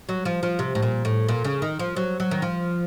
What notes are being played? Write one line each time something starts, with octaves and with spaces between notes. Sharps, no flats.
F#3
F3
F3
C3
A2
A#2
A2
A#2
C#3
D#3
F3
F#3
F#3
D#3
F3